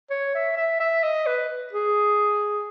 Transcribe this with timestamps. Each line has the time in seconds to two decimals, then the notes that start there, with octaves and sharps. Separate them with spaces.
0.10 C#5
0.35 E5
0.57 E5
0.80 E5
1.03 D#5
1.26 B4
1.73 G#4